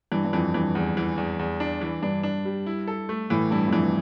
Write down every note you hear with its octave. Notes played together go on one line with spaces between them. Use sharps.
G2 E3
G2
F2 E3
G2 E3
E2
E3
E2
E2
D4
E3
G2 D4
D4
G3
E4
A4
A3
A2 E3
G2 E4
F2
G2 E3